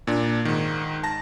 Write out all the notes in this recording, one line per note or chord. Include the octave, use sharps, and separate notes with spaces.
A#2 D4
G#2 D#3
A5 A#6